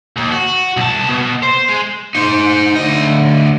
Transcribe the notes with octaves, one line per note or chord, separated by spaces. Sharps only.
D#2
F#4
C2 A5
B2
C5
G#3
D#4 C5
D2 D#5